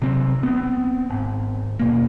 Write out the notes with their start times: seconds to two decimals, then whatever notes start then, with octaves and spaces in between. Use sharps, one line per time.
0.02 C3 F#3 C4
0.43 B3 C4
1.10 G#1
1.79 D#2 B2 A#3